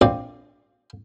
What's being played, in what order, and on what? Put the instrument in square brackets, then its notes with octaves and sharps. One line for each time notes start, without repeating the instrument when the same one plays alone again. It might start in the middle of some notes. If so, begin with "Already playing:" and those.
[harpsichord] A#1 C4 D5